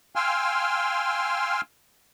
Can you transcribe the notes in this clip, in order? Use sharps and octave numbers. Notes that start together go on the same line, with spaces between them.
F5 G5 G#5 C6 E6 F6